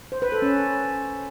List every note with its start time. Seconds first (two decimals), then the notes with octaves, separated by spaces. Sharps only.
0.12 C5
0.22 B4
0.32 A4
0.42 C#4